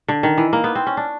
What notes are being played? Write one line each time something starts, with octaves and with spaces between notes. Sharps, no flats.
D3
D#3
E3
A#3
B3
C4
C#4
D4